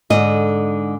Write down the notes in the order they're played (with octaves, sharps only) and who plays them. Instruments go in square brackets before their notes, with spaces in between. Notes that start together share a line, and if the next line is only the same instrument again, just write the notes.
[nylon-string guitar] G#2 D3 D#5